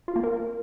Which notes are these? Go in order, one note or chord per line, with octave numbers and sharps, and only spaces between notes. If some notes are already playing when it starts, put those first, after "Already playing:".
F4
A#3
A#4